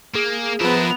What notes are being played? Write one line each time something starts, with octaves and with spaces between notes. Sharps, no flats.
A#3 G#4
F3 B3 A#4 B4 E5